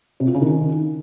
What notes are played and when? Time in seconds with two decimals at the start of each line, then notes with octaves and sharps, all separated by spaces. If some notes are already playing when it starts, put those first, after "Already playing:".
0.20 C3
0.27 F4
0.34 C#3
0.42 D#3